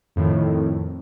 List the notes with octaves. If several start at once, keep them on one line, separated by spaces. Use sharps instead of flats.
F2 A2 D#3